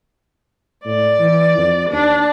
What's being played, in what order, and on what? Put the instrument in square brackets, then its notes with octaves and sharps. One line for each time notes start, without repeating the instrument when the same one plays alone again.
[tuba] A2 [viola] D5
[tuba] E3
F2
[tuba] D#2 [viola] D4